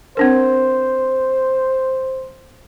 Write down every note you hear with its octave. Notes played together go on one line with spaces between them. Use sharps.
C4 D4 A#4 C5